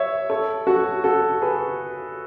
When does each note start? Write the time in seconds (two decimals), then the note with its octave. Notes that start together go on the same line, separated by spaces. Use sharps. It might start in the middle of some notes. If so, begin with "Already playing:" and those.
Already playing: C#5 E5
0.30 A4 C#5
0.67 F#4 A4
1.04 F#4 A4
1.42 G#4 B4